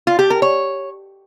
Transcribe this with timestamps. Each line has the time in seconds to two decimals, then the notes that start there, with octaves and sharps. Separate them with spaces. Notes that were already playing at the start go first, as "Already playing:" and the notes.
0.07 F4
0.19 G4
0.30 A#4
0.42 C#5